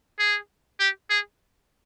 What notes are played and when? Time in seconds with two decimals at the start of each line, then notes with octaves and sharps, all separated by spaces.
0.19 G#4
0.80 G4
1.10 G#4